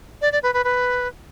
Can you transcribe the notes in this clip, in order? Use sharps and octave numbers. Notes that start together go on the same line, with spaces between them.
D5
D5
B4
B4
B4